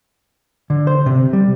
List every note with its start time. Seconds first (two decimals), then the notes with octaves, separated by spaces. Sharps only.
0.70 D3
0.87 C5
1.06 C3
1.33 G3